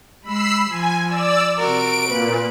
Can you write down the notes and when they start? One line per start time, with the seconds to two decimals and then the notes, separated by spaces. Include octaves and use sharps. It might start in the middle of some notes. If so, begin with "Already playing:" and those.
0.23 G#3 B5 E6 C7
0.70 F3 G#5
1.08 D5 E6
1.58 C3 F#4 A#4 D7
2.08 A#2 B4